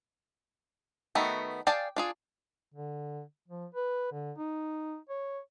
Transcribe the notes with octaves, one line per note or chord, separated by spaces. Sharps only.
D#3 A3 B3 F#4
G#4 D5 F5 G5 A5
D4 F4 G#4
D3
F3
B4
D3
D#4
C#5